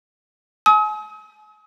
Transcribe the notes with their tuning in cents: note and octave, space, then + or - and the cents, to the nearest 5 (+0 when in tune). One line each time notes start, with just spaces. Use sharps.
G#5 +40 D#6 +45